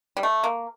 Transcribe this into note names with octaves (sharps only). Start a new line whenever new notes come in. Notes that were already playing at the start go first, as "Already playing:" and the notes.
G3
A3
A#3